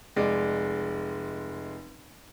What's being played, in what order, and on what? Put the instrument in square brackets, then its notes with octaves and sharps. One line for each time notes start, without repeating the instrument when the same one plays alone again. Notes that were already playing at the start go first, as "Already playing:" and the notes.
[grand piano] F1 G#3 D5